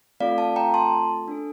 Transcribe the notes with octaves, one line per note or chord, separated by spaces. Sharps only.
A3 C4 F4 A4 D5 F5
F5 A5
G5 A#5
A5 C6
D4 A4